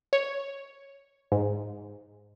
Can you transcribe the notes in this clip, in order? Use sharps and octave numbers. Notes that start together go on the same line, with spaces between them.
C#5
G#2